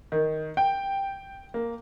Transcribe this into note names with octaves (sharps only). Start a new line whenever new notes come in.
D#3
G5
A#3